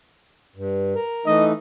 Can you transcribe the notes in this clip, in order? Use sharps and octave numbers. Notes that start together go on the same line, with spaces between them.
G2
A#4
E3 A3 D#4 D#5